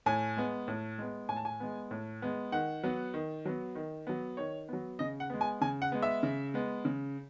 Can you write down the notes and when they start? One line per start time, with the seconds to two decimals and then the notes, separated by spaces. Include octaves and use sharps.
0.06 A2 G#5
0.37 G#3 B3
0.68 A2
0.98 G#3 B3
1.29 A2 G#5
1.36 A5
1.45 G#5
1.60 G#3 B3
1.91 A2
2.22 G#3 B3
2.52 D#3 F#5
2.84 F#3 B3
3.14 D#3
3.45 F#3 B3
3.75 D#3
4.07 F#3 B3
4.37 D#3 C#5
4.68 F#3 B3
4.99 C#3 D#5
5.20 F#5
5.30 G#3 B3
5.41 G#5
5.61 C#3 G#5
5.82 F#5
5.92 G#3 B3
6.02 E5
6.23 C#3
6.54 G#3 B3
6.85 C#3